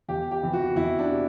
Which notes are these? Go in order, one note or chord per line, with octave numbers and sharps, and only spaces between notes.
E2 G4
G4
C3 E3
F#4
E2 E4
D4
C3